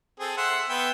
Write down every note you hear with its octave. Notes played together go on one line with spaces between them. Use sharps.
C4 G#4 A4
E5 F#5 C6
B3 E5 G5